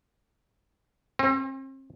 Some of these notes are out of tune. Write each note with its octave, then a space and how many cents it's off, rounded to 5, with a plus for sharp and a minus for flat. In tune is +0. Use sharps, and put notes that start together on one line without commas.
C4 +40